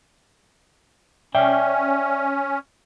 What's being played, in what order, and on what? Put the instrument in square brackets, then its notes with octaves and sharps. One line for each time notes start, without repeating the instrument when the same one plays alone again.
[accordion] C#4 [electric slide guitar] D5 E5 G5